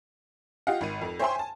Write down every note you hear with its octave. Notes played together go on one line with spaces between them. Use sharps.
F4 G4 D#5 F5 F#5
G#1 D#7
F2
C5 C#5 E5 G5 G#5 C6
G#5 A5